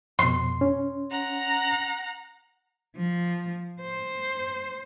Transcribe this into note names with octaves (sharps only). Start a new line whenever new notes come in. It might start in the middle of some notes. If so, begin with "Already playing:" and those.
F2 B2 C6
C#4
F#5 A#5
F3
C5